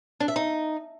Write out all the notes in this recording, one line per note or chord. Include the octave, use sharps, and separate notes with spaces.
D4
E5
D#4